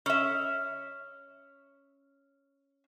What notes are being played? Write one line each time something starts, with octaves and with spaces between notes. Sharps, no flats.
C#4 E5